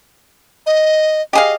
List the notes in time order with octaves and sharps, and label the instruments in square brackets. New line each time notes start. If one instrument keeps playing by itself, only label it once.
[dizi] D#5
[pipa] G4 G#4 F5 [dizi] D#5